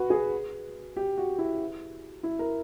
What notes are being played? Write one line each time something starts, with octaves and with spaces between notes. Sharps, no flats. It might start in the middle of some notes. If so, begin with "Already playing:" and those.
Already playing: F#4 B4
G#4
G4
F#4
E4
E4
A#4